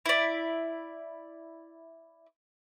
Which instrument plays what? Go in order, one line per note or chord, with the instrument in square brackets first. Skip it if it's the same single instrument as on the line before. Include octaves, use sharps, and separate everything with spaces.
[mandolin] E4 D5